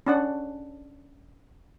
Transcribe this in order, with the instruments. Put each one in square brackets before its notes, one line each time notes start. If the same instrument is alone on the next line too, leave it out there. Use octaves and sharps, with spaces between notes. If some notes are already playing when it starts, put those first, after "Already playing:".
[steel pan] C#4 D4 F#5